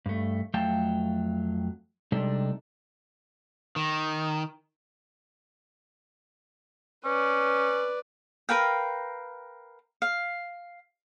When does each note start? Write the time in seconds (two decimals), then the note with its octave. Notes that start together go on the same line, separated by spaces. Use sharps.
0.06 G2 A3
0.54 F2 F#3 A3 F5 G5 A5
2.12 C3 G3 G#3 D4 D#4 A4
3.76 D#3
7.05 C#4 B4 D5
8.49 A#4 B4 F5 G5
10.02 F5